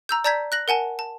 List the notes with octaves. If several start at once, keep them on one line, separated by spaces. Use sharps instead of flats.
A#5 E6 G6
D5 A5 A#5 G6 G#6 B6
F#6 A#6 F#7
A#4 F#5 G#5 A5
A5